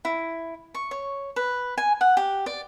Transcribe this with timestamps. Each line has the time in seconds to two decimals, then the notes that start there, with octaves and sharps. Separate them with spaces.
0.05 E4
0.74 C#6
0.91 C#5
1.36 B4
1.78 G#5
2.01 F#5
2.17 G4
2.46 D5